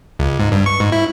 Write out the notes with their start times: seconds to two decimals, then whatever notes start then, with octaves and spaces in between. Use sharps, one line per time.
0.19 C#2
0.39 G#2
0.52 G2
0.66 C#6
0.80 G#2
0.92 E4